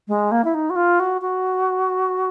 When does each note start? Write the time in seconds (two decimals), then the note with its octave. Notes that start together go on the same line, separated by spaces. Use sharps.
0.08 G#3
0.31 A#3
0.44 E4
0.54 D#4
0.70 F#4
0.76 F4
1.00 F#4
1.22 F#4